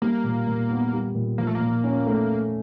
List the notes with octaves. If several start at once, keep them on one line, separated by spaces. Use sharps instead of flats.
G3 A#3
A#2
A#2
B3
G3
A#2
F3 A#3
A3
A#3
A#2
C#4
A3